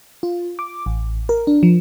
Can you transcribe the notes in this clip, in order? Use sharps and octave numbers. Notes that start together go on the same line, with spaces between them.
F4
D6
A1
A#4
D4
F3